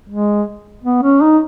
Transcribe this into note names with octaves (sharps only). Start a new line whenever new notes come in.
G#3
B3
C#4
D#4